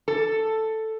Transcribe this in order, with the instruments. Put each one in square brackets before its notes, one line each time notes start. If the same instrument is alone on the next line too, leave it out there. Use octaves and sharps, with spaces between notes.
[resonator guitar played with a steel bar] A4